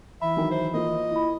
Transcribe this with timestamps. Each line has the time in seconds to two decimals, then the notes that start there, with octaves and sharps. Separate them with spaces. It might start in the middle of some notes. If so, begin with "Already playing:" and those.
0.21 E3 E5 B5
0.37 D#3 F#3
0.51 C5
0.74 A#3 F4 D#5
1.11 E4 B5